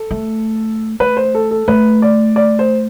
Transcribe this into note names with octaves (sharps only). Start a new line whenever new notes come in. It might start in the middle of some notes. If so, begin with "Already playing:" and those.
Already playing: A4
A3
A3 B4
C5
A4
A4
A3 B4
D5
D5
C5